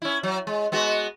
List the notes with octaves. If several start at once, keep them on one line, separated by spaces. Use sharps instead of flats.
C#4 E4
F#3
G#3
G#3 B3 F#4